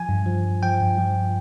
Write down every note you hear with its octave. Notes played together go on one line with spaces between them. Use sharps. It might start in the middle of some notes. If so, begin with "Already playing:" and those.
Already playing: F3 G#5
G2
F3
G2
F3 G5
G2
F3